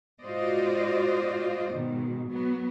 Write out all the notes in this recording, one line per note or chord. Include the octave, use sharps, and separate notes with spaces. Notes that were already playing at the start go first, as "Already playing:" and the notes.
G#2 F4 F#4 C5 D5 D#5
G#2 B2 D#3
F#3 B3